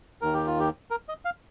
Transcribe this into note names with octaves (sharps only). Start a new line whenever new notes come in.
D#2 D#3 A#4
G4
F4
G4
A#4
D#5
F5